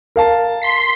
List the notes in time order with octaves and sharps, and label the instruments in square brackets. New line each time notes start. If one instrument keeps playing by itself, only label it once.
[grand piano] A#4 F5 A5
[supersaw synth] C6 B6 C7